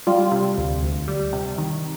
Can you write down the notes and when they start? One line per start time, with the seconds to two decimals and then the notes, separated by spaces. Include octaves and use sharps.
0.07 G3 F4
0.32 C3
0.58 D2
0.83 D2
1.08 G3
1.33 C3
1.58 D#3